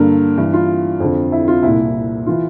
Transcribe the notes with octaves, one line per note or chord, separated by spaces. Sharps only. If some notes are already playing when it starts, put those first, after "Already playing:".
Already playing: G2 D3 A#3 A#4
G2 E3
F4
F2 D3
E4
F4
C2 A#2 E4
E3 F4